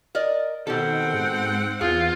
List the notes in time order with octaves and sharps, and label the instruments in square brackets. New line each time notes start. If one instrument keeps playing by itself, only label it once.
[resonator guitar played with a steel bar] A#4 D5 D#5
[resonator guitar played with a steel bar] B2 G4 A4 [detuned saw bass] D#3 [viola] C4 F#5
[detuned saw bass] G#2
[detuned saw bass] E2 [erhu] F4 [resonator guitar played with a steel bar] G#4